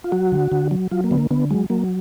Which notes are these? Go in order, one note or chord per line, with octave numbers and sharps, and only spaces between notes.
F4
F#3 F#4
D3
D3
F#3
F#3 F4
A#3
D3 B3
A#3
D3 B3
F#3 G#3
F#3 A#3